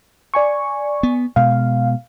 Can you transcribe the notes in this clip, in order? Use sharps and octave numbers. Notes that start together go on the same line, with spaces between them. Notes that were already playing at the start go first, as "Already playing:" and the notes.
D5 G#5 C#6
B3
B2 G#3 F5